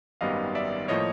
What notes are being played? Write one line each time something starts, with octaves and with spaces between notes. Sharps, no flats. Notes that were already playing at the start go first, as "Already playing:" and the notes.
G#1 F#2 D#3 G3 B3 D#5 F5
D5 E5
A2 F3 A#3 C#5 D#5